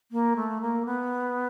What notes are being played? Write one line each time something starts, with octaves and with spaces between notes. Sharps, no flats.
A#3
A3
A#3
B3